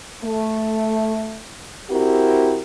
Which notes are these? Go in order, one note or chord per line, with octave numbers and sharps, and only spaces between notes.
A3
C4 E4 F#4 G4 A#4